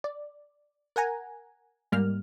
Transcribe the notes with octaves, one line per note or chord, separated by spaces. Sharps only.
D5
A#4 F#5 G#5 A#5
G#2 G3 A#3 F6